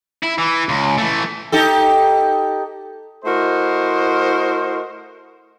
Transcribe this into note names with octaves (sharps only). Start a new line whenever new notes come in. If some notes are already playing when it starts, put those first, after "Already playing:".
E4
E3
C#2
E3 A3
D#4 G4 A4
A3 E4 F#4 A#4 C5 D#5